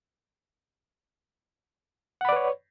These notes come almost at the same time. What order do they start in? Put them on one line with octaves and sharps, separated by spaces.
F#5 B5 D5 B4 C#5